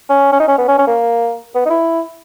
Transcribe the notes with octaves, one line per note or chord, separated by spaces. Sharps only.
C#4
C#4
D#4
C#4
B3
C#4
C#4
A#3
B3
D#4
E4